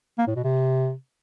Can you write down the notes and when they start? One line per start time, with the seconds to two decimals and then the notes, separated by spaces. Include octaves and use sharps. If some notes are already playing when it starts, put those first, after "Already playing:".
0.18 A#3
0.27 A2
0.36 B2
0.44 C3